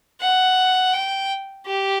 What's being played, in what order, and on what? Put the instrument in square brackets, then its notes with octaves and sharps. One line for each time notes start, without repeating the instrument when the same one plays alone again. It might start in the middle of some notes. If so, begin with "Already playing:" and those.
[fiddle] F#5
G5
G4